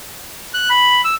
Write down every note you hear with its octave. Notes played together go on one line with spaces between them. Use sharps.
F#6
B5
E6